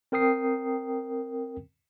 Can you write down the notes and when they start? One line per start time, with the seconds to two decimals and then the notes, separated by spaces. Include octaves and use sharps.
0.12 C4 A#4 G5 D#6 C7